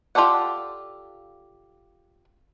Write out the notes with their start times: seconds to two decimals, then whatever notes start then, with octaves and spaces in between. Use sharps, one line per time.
0.15 F4 G4 A4 D5 F#5